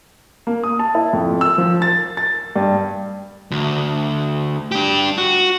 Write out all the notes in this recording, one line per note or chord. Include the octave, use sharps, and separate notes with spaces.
A#3
D#6
A5
E4
F2
E6
F3
A6
A6
G2
D2
D4 G4
F#4